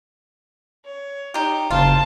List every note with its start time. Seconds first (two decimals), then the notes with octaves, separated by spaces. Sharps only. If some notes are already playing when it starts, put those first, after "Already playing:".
0.86 C#5
1.34 D#4 G4
1.70 F#1 F4 C5 A5